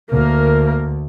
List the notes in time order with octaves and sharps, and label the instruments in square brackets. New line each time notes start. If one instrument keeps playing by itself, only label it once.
[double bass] D2 [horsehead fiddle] A#3 A#4